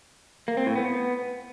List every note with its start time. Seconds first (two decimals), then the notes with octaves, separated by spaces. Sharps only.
0.48 A#3
0.57 C4
0.66 A2
0.75 B3